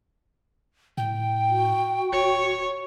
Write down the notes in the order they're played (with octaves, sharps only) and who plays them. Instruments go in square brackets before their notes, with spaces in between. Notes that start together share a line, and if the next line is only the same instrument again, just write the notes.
[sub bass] A2 [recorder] G5
[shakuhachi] F#4
[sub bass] D1 [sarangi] C#5